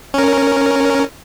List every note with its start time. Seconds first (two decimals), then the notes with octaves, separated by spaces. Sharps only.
0.14 C#4 A#4